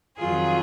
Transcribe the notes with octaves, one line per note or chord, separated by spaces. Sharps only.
F2 D#3 F#3 F4 G#4